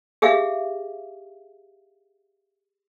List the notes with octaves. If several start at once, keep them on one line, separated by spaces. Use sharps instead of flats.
G4 G#4 E5 F5